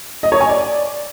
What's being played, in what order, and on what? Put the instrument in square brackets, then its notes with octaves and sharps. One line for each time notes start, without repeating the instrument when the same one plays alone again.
[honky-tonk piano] D#5
C#5
G#5
D5